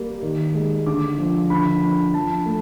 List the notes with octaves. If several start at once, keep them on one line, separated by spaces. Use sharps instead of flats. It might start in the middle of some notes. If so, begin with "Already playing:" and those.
Already playing: G3 A#3
D#3
G#3
D3 D6
F3
D3 B5
F3
F3 A5
A3